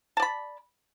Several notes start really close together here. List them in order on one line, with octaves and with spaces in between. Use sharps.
A5 D5 B5